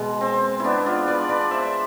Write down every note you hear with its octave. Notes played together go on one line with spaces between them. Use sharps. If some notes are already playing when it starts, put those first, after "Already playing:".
Already playing: B2 G#3
C4
B3 D4 E4
D4 F4
B4 D5
B4 D5
C5 E5